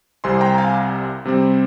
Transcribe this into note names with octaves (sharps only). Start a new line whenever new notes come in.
C2 C3 G3 C4 G#5 C6
G5 A#5
F5 G#5
C3 G3 C4